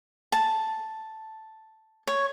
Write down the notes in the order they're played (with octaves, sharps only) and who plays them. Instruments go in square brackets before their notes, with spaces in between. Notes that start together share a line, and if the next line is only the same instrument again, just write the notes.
[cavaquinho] A5
C#5